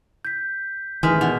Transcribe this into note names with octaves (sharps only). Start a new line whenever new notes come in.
G6 B6
A1 D#3 E3 G#3 G#5 F6 B6
B2 F7